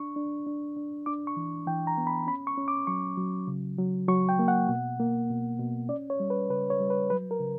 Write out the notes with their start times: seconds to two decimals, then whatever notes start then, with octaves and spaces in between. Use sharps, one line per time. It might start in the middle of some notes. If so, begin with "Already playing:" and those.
Already playing: D4 C#6
0.16 D4
0.46 D4
0.76 D4
1.06 D4 D6
1.27 C#6
1.36 E3
1.67 E3 G5
1.87 A#5
1.97 B3
2.07 B5
2.27 C#4 B5
2.47 C#6
2.57 C#4
2.68 D6
2.87 F#3 C#6
3.17 F#3
3.47 C#3
3.78 F#3
4.08 F#3 C#6
4.29 G5
4.39 A#3
4.48 F#5
4.68 B2
5.00 A#3
5.30 B2
5.59 B2
5.89 C#4 D5
6.10 C#5
6.20 G3
6.30 B4
6.49 C#3 B4
6.70 C#5
6.80 G3
6.90 B4
7.10 F#3 B4
7.31 A#4
7.40 C#3